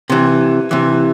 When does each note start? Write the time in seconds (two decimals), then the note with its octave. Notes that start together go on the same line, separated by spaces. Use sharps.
0.10 C3 E3
0.71 C3 E3